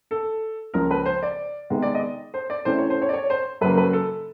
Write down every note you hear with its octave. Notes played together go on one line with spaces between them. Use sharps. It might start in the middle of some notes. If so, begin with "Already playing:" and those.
A4
C#2 C#3 F3 A#3 A#4
B4
C5
D5
C3 D#3 G#3 B3
D5
D#5
C5
D5
C3 E3 A3 C#4 C5
C#5
C5
C#5
D5
C#5
C5
F#2 C#3 F#3 A#3 B4
B4
A4